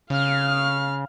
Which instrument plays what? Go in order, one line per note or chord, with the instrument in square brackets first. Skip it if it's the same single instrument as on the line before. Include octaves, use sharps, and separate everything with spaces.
[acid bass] C#3 [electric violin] F5 F6